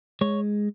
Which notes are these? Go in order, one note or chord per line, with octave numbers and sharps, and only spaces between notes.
G#3 C#5